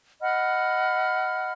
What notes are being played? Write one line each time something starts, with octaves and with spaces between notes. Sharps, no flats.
D#5 F#5 B5 F6